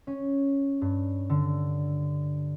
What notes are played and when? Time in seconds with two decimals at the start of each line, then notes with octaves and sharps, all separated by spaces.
0.07 C#4
0.81 G2
1.29 D3